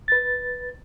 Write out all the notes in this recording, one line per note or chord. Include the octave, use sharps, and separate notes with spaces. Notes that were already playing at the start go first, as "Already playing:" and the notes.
B4 A6